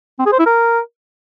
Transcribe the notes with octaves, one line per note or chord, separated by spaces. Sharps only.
C4
G#4
C5
E4
A#4